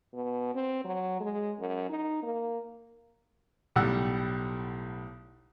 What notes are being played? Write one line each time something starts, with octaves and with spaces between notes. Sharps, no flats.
B2
C4
F#3
G#3
F#2
D#4
A#3
B1 A2 G3 F#5 G5 E6